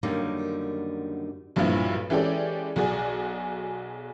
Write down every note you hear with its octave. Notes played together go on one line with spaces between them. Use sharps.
F#2 D3 D#3 G3 A#3
B1 G2 A#2 F3 E4
E3 G#3 C#4 G4 A4 D5
B1 F#4 G#4 D5